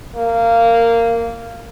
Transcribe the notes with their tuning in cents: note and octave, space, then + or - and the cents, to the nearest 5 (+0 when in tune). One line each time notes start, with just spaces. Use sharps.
A#3 -15